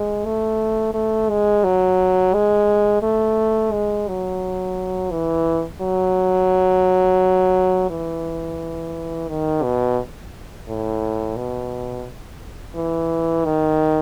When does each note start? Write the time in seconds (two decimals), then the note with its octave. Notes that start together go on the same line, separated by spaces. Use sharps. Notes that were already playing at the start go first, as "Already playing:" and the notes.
Already playing: G#3
0.25 A3
0.94 A3
1.30 G#3
1.64 F#3
2.34 G#3
3.02 A3
3.72 G#3
4.08 F#3
5.11 E3
5.81 F#3
7.90 E3
9.28 D#3
9.63 B2
10.68 A2
11.37 B2
12.76 E3
13.45 D#3